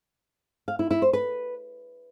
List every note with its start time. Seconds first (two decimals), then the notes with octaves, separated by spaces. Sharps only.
0.68 F5
0.79 E4
0.91 E4
1.02 C5
1.13 B4